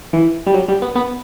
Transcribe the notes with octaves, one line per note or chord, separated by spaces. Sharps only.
E3
G3
F#3
G3
B3
B3